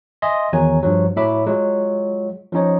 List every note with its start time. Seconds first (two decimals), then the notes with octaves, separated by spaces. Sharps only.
0.22 D#5 E5 G#5 C6
0.53 E2 D#3 F#3 G#5 A#5
0.83 G2 F3 F#3
1.16 A2 F#3 E5 B5 D6
1.46 F#3 G#3 F4
2.53 F3 C#4 D#4 C#5